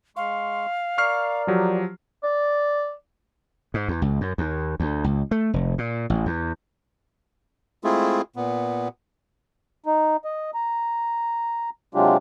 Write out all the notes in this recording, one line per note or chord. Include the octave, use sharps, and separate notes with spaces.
G#3 F5 C6 C#6
A#4 D5 C#6 F6 C7
F3 F#3 G4
D5
G#2
E2
C#2
F#2
D#2
D2
C#2
A3
F1
A#2
A1
E2
G#3 A3 C4 E4 F4 G#4
A#2 B3
D#4
D#5
A#5
C3 F#3 G#3 D4 F4 G4